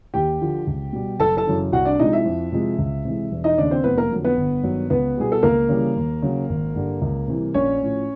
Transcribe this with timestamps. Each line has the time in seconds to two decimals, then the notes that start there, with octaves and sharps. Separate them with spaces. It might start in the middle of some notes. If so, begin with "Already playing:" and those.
0.14 D#2 G4 G5
0.41 D3 F3
0.67 C#2
0.93 B2 G3
1.19 F#1 A4 A5
1.37 A4 A5
1.46 F#2 C#3 E3
1.72 C2 F#4 F#5
1.85 D4 D5
1.99 C3 F3 G#3 D#4 D#5
2.12 E4 E5
2.26 F2
2.52 C3 F3 G#3
2.79 C#2
3.05 C3 E3 G#3
3.32 E1
3.44 D#4 D#5
3.58 D#2 C#3 D4 D5
3.71 C4 C5
3.84 F1 B3 B4
3.97 A#3 A#4
4.11 F2 D3 F#3
4.24 B3 B4
4.37 G1
4.63 G2 D#3 F#3
4.90 C#2 B3 B4
5.17 B2 G3 G#4
5.32 A4
5.43 C#2 A#3 A#4
5.69 C#3 E3 G3
5.96 D#2
6.23 C#3 F#3
6.49 G#1
6.75 G2 D3 G3
7.02 C#2
7.28 C3 E3 G3
7.54 A#1 C#4 C#5
7.81 A2 F3